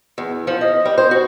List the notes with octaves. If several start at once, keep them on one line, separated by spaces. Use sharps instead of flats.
E2
F3
D#5
G3
C5
F#4